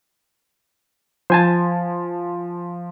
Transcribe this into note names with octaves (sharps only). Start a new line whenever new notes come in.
F3 C5 G#5 A5